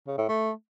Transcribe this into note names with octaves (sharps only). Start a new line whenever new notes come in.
C#3
A2
A3